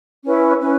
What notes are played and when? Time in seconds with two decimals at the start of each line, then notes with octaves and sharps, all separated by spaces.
0.24 C#4 E4 B4
0.60 C#4 E4 B4